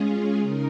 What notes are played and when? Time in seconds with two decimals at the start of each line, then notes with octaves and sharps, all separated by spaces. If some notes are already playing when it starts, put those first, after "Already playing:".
Already playing: G#3 C#4 F4 G#4
0.38 C#3 D#4 A#4